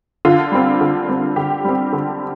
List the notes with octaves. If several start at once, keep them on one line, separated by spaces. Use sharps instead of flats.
D3 F4
G3 C4
D3
G3 C4
D3 G4
G3 C4
D3